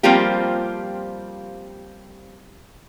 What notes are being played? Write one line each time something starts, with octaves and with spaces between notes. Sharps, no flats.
F3 G3 A#3 C4 F4 G4